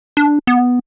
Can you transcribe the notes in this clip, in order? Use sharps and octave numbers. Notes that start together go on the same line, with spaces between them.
D4
B3